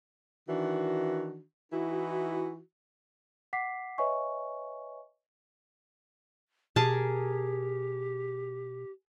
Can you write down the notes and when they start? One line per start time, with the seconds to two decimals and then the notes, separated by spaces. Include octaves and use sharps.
0.48 D#3 E3 D4 F#4
1.72 E3 D#4 E4 F#4
3.53 F#5 D6 B6 C7
3.98 B4 C#5 D#5 E5 G#5 C#6
6.76 B2 G4 G#4 A#4 A5